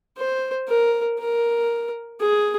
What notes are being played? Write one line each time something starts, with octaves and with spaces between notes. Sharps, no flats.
C5
A#4
A#4
G#4